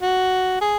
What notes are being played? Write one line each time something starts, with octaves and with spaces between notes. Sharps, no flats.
F#4
G#4